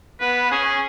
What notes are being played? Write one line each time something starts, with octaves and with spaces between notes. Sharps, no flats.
B3 B4
C#4 G#4